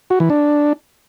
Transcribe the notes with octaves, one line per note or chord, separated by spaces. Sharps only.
F#4
E3
D4